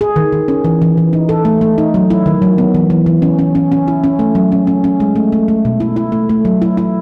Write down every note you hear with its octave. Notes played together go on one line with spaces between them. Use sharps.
G#4
D#3
D#3
C#4
E3
E3
E3
D#4
A4
A3
A3
D#4
F#3
E4
D#3
F#3
B3
E3
E3
E3
C#4
C#4
C#4
C#4
E4
C#4
A3
F#3
C#4
C#4
C#4
G#3
A3
A3
A3
B2
E4
E4
A3
A3
F#3
E4
E4